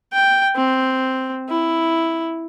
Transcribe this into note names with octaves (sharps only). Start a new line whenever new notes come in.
G5
C4
E4